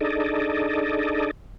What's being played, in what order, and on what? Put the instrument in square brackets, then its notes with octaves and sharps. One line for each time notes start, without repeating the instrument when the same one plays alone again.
[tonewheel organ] D4 D#4 G#4 A4 D5 D#5